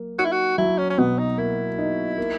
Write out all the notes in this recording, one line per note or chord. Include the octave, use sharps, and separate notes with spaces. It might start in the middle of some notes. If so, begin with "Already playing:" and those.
Already playing: F#3 A#3
D#4 F#4
E4
F#4
F#3 E4
C#4
C#4
B2 B3
D#4
A#3 E4
D#4
A#3